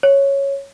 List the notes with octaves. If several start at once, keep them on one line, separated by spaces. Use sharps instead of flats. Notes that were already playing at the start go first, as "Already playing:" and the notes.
C#5